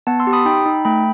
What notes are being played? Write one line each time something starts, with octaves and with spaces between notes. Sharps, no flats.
B3 F#5 A5
C6 E6
G4
B5 D#6
D#4 G5 B5
D#4
A3 G5 B5